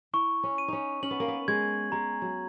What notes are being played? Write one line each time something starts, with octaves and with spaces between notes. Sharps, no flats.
E4 C#6
C#4
D#7
C#4 D#4
C#4 F#7
B3
A#3
B3
G#3 G#6
G#3 A#5
F#3